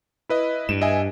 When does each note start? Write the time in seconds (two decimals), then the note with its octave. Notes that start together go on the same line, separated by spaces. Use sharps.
0.29 E4 B4 D#5
0.69 G2 E7
0.82 D#5 E5 G#5